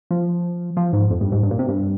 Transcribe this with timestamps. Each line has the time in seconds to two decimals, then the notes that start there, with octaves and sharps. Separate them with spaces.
0.11 F3
0.77 F3
0.93 G#2
1.10 F2
1.21 G2
1.32 G#2
1.43 G2
1.51 A#2
1.59 C3
1.68 G2